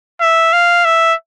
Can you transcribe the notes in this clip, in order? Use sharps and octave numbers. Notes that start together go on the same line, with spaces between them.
E5
F5
E5